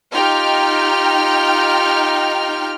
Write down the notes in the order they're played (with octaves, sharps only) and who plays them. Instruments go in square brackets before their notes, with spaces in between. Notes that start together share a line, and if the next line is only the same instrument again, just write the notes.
[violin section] D#4 G5 F6 [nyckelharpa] F4 G4